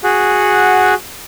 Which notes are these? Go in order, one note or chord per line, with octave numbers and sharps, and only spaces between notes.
F#4 G#4 F#5